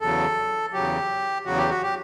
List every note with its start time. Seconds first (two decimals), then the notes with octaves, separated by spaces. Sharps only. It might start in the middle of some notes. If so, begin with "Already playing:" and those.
0.01 E2 C#3 F#3 A4
0.73 E2 C#3 F#3 G4
1.45 E2 C#3 F#3 F#4
1.58 G4
1.70 F#4
1.82 G4